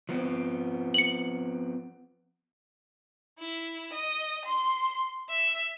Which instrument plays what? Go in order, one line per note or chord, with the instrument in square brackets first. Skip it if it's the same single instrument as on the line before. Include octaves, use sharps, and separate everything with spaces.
[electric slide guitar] F3 B3 C4
[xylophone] C#7 F#7
[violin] E4
D#5
C6
E5